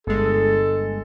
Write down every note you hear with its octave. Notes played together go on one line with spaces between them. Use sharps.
G1 G#3 A4